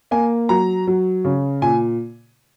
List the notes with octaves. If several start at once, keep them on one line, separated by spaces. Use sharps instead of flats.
A#3 G#5
F#3 A#5
F#3
C#3
A#2 G#5